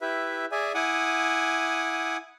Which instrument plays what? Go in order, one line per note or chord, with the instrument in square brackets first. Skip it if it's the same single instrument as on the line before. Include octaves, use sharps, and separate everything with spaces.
[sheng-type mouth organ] E4 G4 B4 E5
G#4 D5 E5 G#5
E4 F#5 G#5 D6 D#6